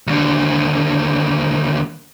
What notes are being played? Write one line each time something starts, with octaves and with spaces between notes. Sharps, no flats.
D#2 D3